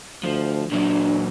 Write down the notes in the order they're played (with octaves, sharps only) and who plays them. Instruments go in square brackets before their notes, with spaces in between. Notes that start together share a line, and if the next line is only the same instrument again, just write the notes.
[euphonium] D2 [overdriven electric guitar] F3
[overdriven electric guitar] A#2 F#3 [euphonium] D4